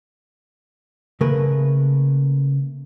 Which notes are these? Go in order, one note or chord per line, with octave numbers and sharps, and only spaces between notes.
C#3 A3 A#3 A#4 B4